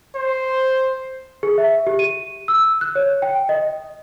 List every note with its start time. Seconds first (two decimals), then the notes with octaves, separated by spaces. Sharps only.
0.15 C5
1.43 G#4
1.58 E5
1.87 G4
1.99 D#7
2.48 E6
2.81 F#6
2.95 C#5
3.22 G5
3.49 D#5